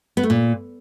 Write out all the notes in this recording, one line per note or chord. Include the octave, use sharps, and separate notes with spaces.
B3
A3
A#2